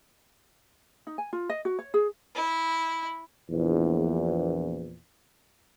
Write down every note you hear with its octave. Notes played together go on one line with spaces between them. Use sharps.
D#4
G#5
F4
D#5
F#4
C#5
G#4
E4
A#1 E2